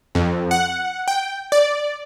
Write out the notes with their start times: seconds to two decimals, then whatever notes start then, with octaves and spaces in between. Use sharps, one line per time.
0.15 F2
0.51 F#5
1.08 G5
1.52 D5